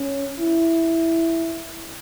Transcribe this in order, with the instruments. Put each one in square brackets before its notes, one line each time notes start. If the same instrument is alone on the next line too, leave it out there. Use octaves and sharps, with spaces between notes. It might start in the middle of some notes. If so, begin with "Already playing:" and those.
Already playing: [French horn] C#4
E4